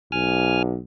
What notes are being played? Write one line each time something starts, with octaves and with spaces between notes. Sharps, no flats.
B1 G#5 F6